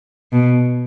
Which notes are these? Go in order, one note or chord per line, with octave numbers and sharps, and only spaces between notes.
B2